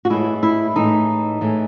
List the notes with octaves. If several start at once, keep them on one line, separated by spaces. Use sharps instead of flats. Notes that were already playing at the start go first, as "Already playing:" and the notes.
F#4
A2 E3 G#3 E4
E4
A2 E3 G#3 D#4
A2 E3 G#3